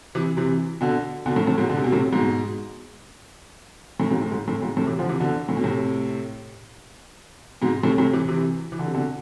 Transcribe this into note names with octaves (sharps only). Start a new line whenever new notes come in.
C3 E3
C3 E3
B2 D3
B2 D3
A2
A2
G#2 B2
D3
C3
B2
A2 C3
G#2 B2
A2
G#2 B2
A2
G#2
A2
G#2 B2
A2 C3
C3 E3
D3 F3
C3 E3
B2 D3
A2
B2
A2 C3
G#2 B2
A2 C3
A2 C3
C3 E3
C3 E3
E3
D3
C3
B2 D3